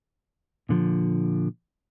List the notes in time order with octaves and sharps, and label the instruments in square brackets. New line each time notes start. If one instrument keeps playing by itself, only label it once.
[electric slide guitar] A#2 D3 F3